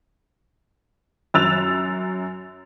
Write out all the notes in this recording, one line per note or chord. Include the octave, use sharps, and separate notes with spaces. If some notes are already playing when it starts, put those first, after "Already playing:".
F#2 E6 F#6 A6 F7